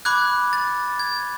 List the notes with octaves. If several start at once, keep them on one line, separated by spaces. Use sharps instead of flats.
B5 D6 F#6 G#6
A6
G#6